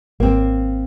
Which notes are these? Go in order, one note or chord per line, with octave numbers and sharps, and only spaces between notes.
G#1 A#3 C4